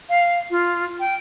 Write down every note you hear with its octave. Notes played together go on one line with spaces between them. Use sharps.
F5
F4
G5